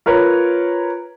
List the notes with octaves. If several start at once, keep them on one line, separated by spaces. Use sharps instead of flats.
F4 A#4 B4 C#5